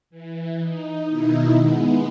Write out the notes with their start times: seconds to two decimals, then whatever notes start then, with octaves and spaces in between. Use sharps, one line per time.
0.10 E3
0.59 D#4
1.09 B2 D#3 D#4 E4
1.55 G#3 B3